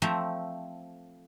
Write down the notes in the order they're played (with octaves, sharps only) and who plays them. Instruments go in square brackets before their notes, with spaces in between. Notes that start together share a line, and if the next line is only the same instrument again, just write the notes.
[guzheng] F3 A3 C4 E5 A#5